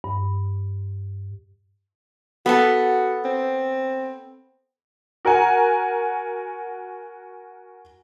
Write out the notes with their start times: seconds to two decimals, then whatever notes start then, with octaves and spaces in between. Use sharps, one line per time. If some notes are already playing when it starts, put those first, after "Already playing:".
0.04 G2
2.46 B3 F#4 A4 A5
3.25 C4
5.25 F#4 A#4 F#5 G#5